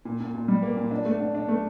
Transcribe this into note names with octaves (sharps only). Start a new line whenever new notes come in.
A#2
A#2
A#2
G3
A#3
A#2
D4
A3
D4
D4
A3